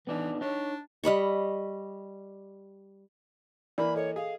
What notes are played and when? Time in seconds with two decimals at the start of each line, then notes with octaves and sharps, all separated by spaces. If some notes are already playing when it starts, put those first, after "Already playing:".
0.07 E3 B3 D4 D#4
0.41 D4 D#4 C#5
1.04 G3 D#5 B5 C#6
3.78 E3 A#3 D5 B5
3.96 A4 C#5 D#5
4.16 G#4 F5